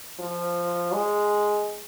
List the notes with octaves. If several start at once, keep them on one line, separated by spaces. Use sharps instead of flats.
F3
G#3